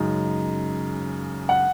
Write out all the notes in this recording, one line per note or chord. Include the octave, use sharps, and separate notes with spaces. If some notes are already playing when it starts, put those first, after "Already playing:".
Already playing: F#2 C#3 G#3 D#4
F#5